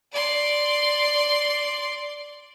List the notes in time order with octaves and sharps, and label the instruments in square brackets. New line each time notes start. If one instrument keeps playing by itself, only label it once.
[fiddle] D5 C6